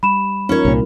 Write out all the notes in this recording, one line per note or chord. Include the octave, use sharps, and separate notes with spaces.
G3 B5 E7
C#4 D#4 F4 A#4 C#5
C2 A#2 G3 C4 D#4